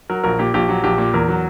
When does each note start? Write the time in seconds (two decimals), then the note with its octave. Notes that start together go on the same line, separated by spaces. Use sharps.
0.10 F#3 A#4
0.24 A#1 A#4
0.39 A#2 G4
0.54 A#1 G4
0.69 F#3
0.84 A#1 G4
0.98 A#2
1.13 E2 A#4
1.28 F#3